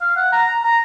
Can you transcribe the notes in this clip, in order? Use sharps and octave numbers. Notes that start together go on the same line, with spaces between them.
F5
F#5
A#5
A#5